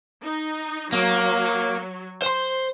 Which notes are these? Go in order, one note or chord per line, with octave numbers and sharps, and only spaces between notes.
D#4
F#3 A#3
C5 C6